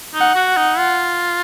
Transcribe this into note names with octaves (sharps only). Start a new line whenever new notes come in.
D#4
F#5
F#4
F#5
D#4
F4